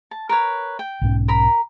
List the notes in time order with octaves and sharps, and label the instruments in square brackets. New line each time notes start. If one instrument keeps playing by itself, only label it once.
[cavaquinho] A5
A#4 B4 C#5
G5
[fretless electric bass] B1 G#2 C#4
[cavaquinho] A#4 A#5 B5